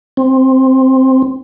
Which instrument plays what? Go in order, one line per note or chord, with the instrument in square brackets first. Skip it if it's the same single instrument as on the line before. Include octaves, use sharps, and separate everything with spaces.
[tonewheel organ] C4